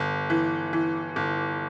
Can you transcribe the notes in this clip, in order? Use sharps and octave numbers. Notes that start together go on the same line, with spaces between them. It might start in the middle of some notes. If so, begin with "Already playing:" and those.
Already playing: G1
E3
E3
G1